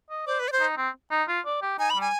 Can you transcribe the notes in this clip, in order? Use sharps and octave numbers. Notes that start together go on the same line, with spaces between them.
D#5
C5 D5
B4
D5
C5
D#4
C4
D#4
F4
D5
G4
D#4 G#5
B5
G3 G#5